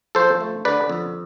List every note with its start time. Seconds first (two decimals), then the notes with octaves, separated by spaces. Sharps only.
0.15 F3 A4 C5
0.41 A3
0.65 D3 B4 D5
0.89 F2